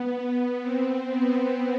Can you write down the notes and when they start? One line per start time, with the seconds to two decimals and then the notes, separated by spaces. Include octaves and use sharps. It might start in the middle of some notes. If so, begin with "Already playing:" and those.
Already playing: B3
0.61 C4
1.08 B3